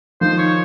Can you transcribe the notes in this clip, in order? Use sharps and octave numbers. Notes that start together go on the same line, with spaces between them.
D#3 F3 C5
C#5